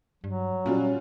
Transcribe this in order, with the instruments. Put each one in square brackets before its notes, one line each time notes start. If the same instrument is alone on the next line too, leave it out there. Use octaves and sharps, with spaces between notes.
[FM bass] G2 [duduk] F#3
[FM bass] A#2 [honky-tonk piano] G3 F4 F#4 [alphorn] C#4